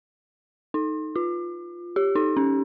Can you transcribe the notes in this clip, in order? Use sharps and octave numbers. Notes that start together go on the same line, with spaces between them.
D#4
F4
G4
D#4
C#4